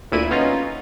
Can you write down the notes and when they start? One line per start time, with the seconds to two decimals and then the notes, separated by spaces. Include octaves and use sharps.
0.12 D2 A#2 E4 D#7
0.31 B3 C#4 D#4 F4